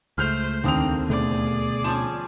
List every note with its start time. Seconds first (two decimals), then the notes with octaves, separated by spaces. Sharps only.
0.18 C#2 A3 C5 F6 G6 F7
0.64 D#2 D3 A#3 C4 D#6 F7
1.09 D2 B2 A3 G#4 D5
1.84 F3 C#4 E7